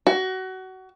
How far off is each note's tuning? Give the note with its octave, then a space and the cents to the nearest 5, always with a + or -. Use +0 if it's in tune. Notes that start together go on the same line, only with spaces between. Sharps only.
F#4 +25